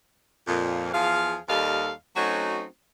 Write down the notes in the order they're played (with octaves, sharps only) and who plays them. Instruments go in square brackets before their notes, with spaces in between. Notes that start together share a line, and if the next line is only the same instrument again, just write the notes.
[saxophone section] F2 A#2
E2 F3 G#4 F5
D#2 G3 A4 D#5 F5
F#3 A3 C4 C#4 D#4 F#4